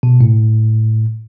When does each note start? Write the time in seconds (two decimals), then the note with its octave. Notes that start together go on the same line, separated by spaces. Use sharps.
0.03 B2
0.21 A2